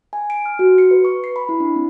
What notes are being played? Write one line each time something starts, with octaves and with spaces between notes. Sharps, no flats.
G#5
D7
F6
F#4
C#7
B4
C#6
C7
B5
E4
D4
C4